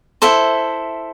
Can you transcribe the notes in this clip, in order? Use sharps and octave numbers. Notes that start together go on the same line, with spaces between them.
E4 A4 C5 E5